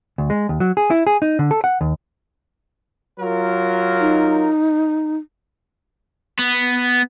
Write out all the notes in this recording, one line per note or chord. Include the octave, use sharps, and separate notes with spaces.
D2
G#3
D#2
F#3
G#4
E4
G#4
D#4
D3
A4
F#5
D#2
F#3 F4 A#4
D#4
B3